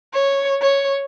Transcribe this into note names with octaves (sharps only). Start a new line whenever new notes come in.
C#5
C#5